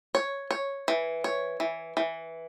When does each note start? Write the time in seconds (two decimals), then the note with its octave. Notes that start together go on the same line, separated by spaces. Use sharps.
0.15 C#5
0.51 C#5
0.88 E3
1.24 C#5
1.60 E3
1.97 E3